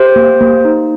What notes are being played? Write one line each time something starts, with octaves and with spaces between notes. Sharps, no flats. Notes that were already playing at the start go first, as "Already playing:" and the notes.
Already playing: G4 C5
A#3
A#3
D#4